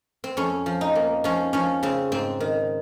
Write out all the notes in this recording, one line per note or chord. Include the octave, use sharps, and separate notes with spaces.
C4
F2 C#4
F3
D#4
A#3
F3 C#4
F3 C#4
C#3 C4
G#2 C4
D#3